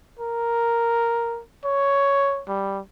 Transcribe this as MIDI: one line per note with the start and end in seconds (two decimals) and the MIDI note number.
0.19 1.41 70
1.64 2.43 73
2.48 2.80 55